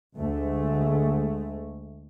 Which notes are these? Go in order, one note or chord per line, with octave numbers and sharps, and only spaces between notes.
D2 G#3 A3